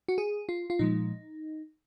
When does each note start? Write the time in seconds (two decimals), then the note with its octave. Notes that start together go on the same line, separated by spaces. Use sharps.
0.08 F#4
0.18 G#4
0.49 F4
0.70 F4
0.79 A#2 F3 G#3 D#4